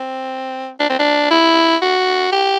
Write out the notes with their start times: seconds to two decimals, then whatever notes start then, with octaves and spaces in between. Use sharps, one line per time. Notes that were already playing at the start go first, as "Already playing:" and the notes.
Already playing: C4
0.80 D4
0.90 C4
0.99 D4
1.31 E4
1.82 F#4
2.32 G4